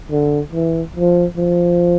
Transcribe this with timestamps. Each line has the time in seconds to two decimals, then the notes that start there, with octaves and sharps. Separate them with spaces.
0.11 D3
0.53 E3
0.96 F3
1.37 F3